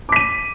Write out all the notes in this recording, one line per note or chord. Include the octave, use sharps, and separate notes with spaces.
D6 B6 D#7